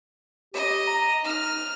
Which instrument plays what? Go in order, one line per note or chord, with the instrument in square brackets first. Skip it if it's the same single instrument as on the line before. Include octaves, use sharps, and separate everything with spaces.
[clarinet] G4 [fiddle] D#5
[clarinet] A#5
[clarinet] D#4 [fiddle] F6